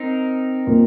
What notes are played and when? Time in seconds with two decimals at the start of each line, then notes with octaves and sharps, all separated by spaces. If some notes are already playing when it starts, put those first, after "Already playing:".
Already playing: C4 D#4 A#4
0.67 A#2 A#3